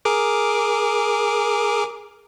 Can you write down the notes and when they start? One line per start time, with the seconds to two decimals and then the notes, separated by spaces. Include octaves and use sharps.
0.05 G#4 A#4 D6